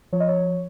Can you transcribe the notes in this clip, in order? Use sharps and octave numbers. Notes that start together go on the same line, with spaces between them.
F3 C#5
D#5
C#5